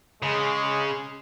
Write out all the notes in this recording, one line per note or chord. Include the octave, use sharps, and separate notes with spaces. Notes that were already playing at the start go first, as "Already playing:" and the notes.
C#3 G#3